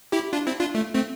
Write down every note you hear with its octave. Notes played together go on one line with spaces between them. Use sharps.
E4 G4
D4 F4
C4 E4
D4 F4
A3
A3 C4